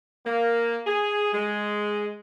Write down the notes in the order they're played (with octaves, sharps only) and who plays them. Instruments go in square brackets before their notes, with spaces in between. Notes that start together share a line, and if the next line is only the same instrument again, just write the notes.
[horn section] A#3
G#4
G#3